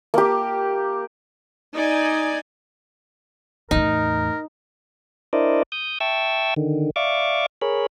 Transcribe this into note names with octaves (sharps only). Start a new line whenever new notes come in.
A#3 G4
D#4 D5 G#5
E2 A2 D#4 A#4
D4 E4 A#4 C5 D5 D#5
D#6 G6
E5 G5 A5 C#6 E6
D3 D#3
D5 E5 F5 C#6 D6
G#4 A#4 C#5 B5